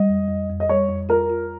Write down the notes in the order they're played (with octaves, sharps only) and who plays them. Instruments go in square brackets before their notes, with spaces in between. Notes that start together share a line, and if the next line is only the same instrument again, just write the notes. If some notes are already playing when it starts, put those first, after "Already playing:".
Already playing: [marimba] G3 [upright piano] D#5
[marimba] F2
F2
F2
[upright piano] D#5
[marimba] G3 [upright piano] C#5
[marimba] F2
[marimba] F4 [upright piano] A#4
[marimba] F4